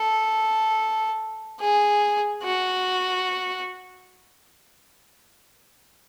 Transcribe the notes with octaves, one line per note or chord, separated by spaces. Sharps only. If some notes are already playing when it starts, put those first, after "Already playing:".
Already playing: A4
G#4
F#4